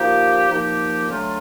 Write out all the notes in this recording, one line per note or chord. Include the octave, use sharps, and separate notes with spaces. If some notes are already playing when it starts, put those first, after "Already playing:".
Already playing: A#2 F3 A#3 D#4 G4
A#2 F3 A#3 D#4 G4
D3 F#3 A3 C#4 F4